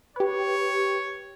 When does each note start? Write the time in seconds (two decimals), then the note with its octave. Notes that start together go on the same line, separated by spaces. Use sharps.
0.16 G4 B4 C#5